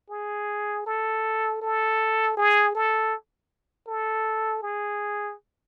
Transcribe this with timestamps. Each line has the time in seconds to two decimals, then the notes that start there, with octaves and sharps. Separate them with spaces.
0.10 G#4
0.86 A4
1.61 A4
2.37 G#4
2.75 A4
3.87 A4
4.62 G#4